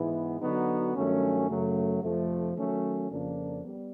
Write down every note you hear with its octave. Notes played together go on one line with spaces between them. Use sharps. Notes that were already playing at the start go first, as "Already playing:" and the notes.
Already playing: G#2 E3 G#3 B3 E4
D3 F#3 B3 D#4 F#4
G2 D#3 F#3 A3 C#4
F#2 C#3 F#3 A3
F2 C3 F3 A3
D#3 F#3 A3 C#4
F2 C#3 F3 A#3 D4
G3 B3